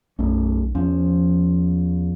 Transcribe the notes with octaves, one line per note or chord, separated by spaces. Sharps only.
B1 F#2 A3 C#4
E2 F3 C#4